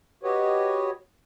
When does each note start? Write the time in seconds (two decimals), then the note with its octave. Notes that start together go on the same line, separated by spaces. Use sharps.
0.23 F#4 G4 B4 C#5 D#5